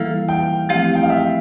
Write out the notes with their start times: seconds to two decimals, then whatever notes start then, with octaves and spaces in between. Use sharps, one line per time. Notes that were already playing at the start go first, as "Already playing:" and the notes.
Already playing: E3 G3 A#3 E4 A4 F5
0.29 G5
0.69 F3 A3 C4 E4 G4 F5
0.95 G5
1.03 F5
1.10 E5